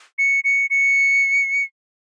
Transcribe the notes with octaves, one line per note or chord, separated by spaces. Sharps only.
C#7
C#7
C#7